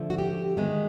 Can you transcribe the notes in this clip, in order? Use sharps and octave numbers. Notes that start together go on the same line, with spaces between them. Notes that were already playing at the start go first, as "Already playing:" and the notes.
Already playing: D3 F3 A3
F#4
G4
D#3 G#3 B3